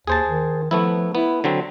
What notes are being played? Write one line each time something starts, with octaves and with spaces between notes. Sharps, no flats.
D#2 G#4 C5 A5
D#3
F3 A3 B3 E4
B3 E4
D3 F#3 C4